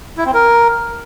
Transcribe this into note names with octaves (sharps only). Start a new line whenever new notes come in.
E4
C4
A#4